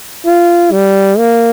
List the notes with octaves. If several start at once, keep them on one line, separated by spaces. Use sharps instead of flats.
F4
G3
A#3